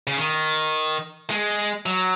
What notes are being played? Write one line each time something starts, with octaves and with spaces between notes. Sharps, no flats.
C#3
D#3
G#3
F#3